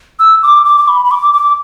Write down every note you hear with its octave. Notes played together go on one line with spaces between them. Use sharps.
E6
D6
D6
D6
B5
B5
D6
D6